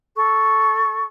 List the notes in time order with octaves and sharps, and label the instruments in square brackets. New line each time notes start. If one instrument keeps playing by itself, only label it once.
[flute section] A4 C#6